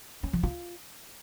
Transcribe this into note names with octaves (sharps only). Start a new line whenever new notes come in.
C#4
F3
F4